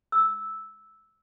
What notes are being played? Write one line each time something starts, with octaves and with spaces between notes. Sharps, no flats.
E6